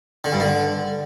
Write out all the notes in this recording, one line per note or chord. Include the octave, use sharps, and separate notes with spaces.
D3
G2
D3